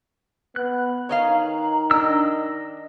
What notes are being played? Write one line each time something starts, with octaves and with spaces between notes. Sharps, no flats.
B3 F#6
D#3 C#5 D#5 F5 A#5
D4 D#5 E6